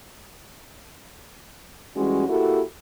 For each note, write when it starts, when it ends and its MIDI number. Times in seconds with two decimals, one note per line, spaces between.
1.96 2.28 52
1.96 2.28 55
1.96 2.28 56
1.96 2.28 61
1.96 2.28 66
2.28 2.62 58
2.28 2.62 64
2.28 2.62 66
2.28 2.62 67
2.28 2.62 69